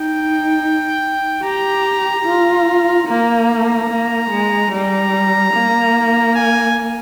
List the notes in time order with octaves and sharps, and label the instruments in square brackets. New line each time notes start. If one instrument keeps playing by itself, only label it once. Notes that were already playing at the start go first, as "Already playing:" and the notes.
Already playing: [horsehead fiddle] D#4 [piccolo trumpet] G5
[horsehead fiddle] G4 [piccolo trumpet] A#5
[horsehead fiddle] F4
[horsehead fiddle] A#3 [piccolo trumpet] A#5
[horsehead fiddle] A#3
G#3
[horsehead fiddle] G3 [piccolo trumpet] A#5
[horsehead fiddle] A#3
[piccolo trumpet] G#5